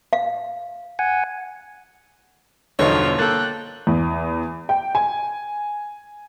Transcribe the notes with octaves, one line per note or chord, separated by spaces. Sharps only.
F5
F#5 G#5
E2 G2 B2 D3 F3 D#4 F4 C#5
A#3 A4 G5 F#6 A6
E2
G5
G#5